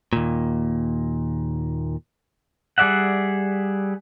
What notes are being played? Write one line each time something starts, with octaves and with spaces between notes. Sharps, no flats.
D#2 A#2
G3 G#4 D5 E5 F#5